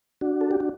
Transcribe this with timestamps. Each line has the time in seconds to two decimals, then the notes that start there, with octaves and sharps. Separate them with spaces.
0.21 D4 F#4
0.41 A4
0.51 G4
0.60 D4 F#4